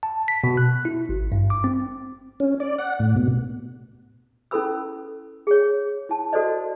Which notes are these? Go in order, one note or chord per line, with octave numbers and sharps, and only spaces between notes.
A5
B6
B2
F#6
E4
G#1
G2
D6
C4
C#4
D5
F#5
A2
B2
C#4 E4 A4 B4 B5 E6
G#4 C#5
E4 A5
F#4 A4 C5 D5 D#5